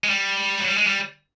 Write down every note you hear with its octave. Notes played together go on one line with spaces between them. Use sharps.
G#3
G3
F#3
G3
G#3
G3